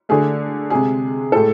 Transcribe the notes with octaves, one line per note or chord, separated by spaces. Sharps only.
D3 A3 G#4
C3 G#3 G#4
A2 G#3 A4